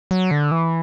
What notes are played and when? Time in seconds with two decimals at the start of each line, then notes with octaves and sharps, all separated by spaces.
0.11 F#3
0.31 D3
0.51 E3